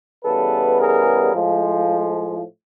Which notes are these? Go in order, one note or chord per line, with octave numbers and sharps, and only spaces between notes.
C#3 E3 G3 B3 A4 B4
G#4 A#4
A2 F3 G#3